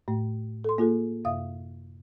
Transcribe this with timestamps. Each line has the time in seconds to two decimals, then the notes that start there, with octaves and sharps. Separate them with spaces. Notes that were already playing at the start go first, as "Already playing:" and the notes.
0.08 A2 A3
0.64 A4 C6
0.78 A#3 F4 G#4 A4
1.24 F#2 C3 E5 F5 D#6